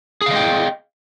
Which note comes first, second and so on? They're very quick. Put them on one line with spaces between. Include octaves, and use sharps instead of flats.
G#4 F5 D#5 G5